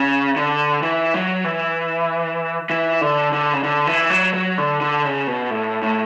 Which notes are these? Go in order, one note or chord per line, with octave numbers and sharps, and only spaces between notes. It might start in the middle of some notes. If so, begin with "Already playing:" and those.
Already playing: C#3
D3
E3
F#3
E3
E3
D3
D3
C#3
D3
E3
F#3
F#3
D3
D3
C#3
B2
A2
A2